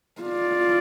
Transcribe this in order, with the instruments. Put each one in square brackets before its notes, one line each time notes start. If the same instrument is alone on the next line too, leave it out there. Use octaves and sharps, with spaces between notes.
[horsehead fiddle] F4 [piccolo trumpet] D5